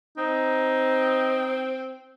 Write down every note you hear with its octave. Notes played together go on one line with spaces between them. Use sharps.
C4 D#4